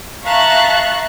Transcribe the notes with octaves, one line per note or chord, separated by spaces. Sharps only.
E5 F5 A5 A#5 C#6 F#6